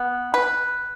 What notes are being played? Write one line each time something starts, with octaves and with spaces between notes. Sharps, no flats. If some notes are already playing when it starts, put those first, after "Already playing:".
Already playing: B3
B4